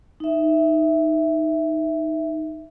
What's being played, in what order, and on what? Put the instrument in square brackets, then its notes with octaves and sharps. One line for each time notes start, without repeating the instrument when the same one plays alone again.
[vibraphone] D#4 E5